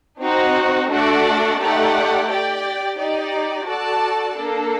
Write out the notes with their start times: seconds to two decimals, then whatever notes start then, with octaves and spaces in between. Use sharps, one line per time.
0.22 C4 D#4 F#4
0.91 A3 D4 F#4 A4 D5
1.61 A3 D#4 G4 D5 F#5
2.29 G4 D5 G5
2.99 D#4 G4 D5
3.67 F#4 A4 D5 A5
4.37 A#3 D4 A4